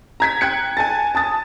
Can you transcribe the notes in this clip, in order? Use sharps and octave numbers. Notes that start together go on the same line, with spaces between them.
A#5 G#6 B6
G5 F#6 G#6 C#7
G#5 A5 A6
A5 D#6 A6